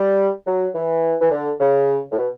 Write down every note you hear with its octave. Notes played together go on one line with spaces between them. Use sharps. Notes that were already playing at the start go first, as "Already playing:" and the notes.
Already playing: G3
F#3
E3
E3
D3
C#3
A2
B2